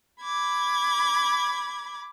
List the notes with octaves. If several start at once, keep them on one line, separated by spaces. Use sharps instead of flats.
B5 D6 G#6